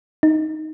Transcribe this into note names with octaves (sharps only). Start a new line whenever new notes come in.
D#4